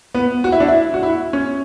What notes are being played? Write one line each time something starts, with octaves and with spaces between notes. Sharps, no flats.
B3
F#4
E4
D4
E4
F#4
E4
C#4